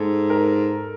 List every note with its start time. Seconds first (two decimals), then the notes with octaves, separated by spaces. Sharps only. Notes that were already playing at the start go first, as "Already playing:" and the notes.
Already playing: G#2 A4
0.30 A#4